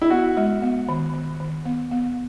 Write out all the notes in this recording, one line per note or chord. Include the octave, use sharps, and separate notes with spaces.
E4
B3 F#4
G#3
B3
D#3
D#3
D#3
B3
B3